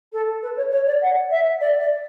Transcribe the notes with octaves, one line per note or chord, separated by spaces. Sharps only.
A4
B4
C#5
C#5
D5
F#5
E5
D5
D5